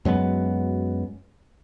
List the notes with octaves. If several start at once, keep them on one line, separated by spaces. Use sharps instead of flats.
F#2 F#3 G#3 B3